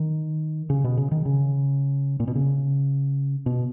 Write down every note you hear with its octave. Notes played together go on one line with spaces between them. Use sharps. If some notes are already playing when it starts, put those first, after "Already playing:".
Already playing: D#3
C#3
B2
C#3
D#3
C#3
A#2
B2
C#3
B2